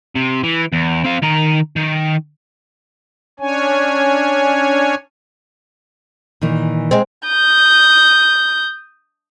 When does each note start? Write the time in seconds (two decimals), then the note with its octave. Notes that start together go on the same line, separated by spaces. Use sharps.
0.15 C3
0.43 E3
0.73 E2
1.04 C4 F5
1.23 D#3 A#5
1.76 D#3
3.40 C#4 D4 C#5 G#5
6.41 A#2 D#3 E3
6.91 G#3 C4
7.27 D#6 G6